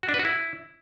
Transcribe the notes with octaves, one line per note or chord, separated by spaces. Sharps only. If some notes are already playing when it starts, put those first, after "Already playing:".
F#4
D4
B4
F#4
E4